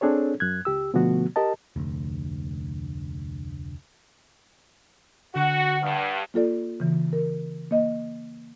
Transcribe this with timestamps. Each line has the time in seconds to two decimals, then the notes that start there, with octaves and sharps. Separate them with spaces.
0.01 C4 D4 G#4 A4 C#5
0.40 F#2 F#6 G#6
0.65 C#2 G4 E6
0.94 B2 D3 F3 A3 B3 F#4
1.36 G4 A#4 D#5 A5
1.76 F1 D2
5.34 D3 F#4 F#5
5.83 G2 C#6 D#6 F6
6.34 A#3 F4 A4 D5
6.80 C#3 E3
7.13 A#4
7.71 A#3 D#5